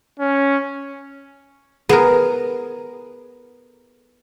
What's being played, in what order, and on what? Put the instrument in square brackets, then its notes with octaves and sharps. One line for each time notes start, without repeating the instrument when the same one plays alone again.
[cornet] C#4
[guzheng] B3 A#4 [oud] G#4